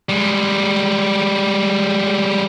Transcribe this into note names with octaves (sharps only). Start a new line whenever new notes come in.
G3 G#3